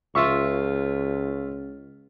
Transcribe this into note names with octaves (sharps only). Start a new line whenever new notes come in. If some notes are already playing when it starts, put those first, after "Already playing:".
C#2 F4 E5 C#6